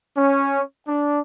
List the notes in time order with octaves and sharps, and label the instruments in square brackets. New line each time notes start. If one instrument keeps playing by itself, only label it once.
[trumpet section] C#4
D4